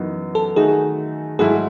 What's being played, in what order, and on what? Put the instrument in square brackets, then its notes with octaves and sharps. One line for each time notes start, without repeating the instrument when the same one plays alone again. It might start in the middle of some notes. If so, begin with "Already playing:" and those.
Already playing: [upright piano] F#2 E3 B3 D#4 F#4
[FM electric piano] A4
[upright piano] D#3 A3 D#4 F#4 [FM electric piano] G#4
[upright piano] G#2 F#3 A3 E4 [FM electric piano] G#4